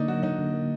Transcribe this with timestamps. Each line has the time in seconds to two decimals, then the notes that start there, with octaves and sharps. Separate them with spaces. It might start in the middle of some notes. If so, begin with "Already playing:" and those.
Already playing: D3 A#3 D4 D#4
0.08 F#3 F#4
0.23 D3 D#4
0.39 D3
0.54 A#3